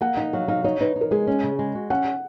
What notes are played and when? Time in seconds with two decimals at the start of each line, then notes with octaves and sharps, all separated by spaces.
0.01 A#3 F#5
0.17 D#4 F#5
0.33 F#3 F5
0.48 D#4 F5
0.64 D#4 C#5
0.80 D#4 B4
0.96 D#4
1.01 A#4
1.11 G#3 G#4
1.27 C#4
1.43 C#3
1.59 G#3
1.75 F#4
1.90 C#4 F#5